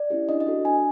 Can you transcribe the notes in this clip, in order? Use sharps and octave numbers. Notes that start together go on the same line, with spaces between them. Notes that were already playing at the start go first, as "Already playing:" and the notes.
Already playing: D5
C#4 E4 G4
D4 D#5
D#5
F#4 A4
D4 G#5